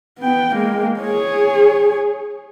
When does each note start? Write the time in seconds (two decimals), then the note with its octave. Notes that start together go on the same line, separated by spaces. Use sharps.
0.19 B3 G5
0.54 G#3 A#3
1.00 G#4 C#5